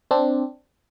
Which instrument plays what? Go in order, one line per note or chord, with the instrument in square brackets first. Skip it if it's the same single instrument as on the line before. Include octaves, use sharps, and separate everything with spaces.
[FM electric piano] C4 D4